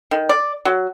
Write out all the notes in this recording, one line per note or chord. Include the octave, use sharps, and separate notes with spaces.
D#3
D5
F#3